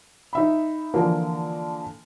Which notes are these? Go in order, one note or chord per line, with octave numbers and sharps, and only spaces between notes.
D#4 E5 B5
D3 E3 F3 A#3